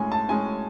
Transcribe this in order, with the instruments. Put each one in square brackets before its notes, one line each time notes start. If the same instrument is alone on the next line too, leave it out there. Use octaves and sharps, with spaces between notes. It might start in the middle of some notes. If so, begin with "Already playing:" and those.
Already playing: [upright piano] A2 G#3 C#4 G#5
A5
A2 G#3 C#4 G#5